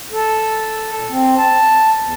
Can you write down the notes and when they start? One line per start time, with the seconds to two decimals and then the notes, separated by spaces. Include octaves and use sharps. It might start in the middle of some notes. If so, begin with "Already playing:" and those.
0.12 A4
0.95 A#2
1.10 C4
1.38 A5
2.01 E2